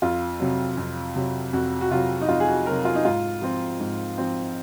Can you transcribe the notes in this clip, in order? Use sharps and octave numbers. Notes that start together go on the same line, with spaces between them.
F2 F4
C3 F#3
F2
C3 F#3
F2 F#4
F#4
C3 F#3 F4
D#4
F2 F4
G#4
F#4
C3 F#3 A#4
F4
D#4
G#2 F4
F3 C4
G#2
F3 C4